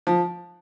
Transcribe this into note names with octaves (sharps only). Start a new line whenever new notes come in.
F3